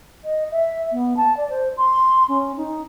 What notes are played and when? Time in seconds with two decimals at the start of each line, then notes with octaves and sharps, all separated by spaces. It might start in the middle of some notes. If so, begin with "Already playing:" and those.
0.24 D#5
0.51 E5
0.92 B3
1.17 A5
1.37 D5
1.50 C5
1.77 C6
2.28 C#4
2.57 D#4